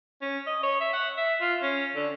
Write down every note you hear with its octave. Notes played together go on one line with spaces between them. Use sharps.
C#4
D#5
C#5
E5
F#5
E5
F4
C#4
D3